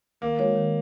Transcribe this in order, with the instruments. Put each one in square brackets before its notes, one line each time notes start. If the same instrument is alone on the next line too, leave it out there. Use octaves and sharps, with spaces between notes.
[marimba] D#3 [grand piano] A#3
[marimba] G#3 D#4 F#4 C#5
D#3